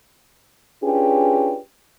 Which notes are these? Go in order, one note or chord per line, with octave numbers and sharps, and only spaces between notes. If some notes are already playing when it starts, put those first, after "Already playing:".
C#4 D4 F4 G4 G#4 B4